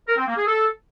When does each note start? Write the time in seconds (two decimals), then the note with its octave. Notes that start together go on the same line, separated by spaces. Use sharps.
0.08 A#4
0.17 C4
0.27 A#3
0.37 G#4
0.47 A4